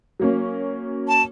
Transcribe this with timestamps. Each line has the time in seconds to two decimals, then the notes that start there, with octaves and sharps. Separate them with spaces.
0.20 F#3 A#3 C#4
1.08 A5